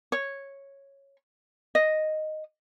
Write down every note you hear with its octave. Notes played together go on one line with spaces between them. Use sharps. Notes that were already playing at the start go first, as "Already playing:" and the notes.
C#5
D#5